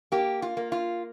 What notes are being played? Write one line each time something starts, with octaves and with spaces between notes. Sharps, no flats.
A#3 G4
F4
A#3
F4